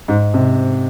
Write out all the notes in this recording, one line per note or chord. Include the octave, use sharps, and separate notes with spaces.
G#2
C3